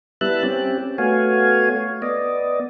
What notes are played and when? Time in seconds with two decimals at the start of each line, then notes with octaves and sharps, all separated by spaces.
0.21 G3 B3 E4 E5 A5 F#6
0.43 C4 C#4 G4
0.98 A3 B3 F#4 C#5 F5 G#5
2.02 B3 D5 D#5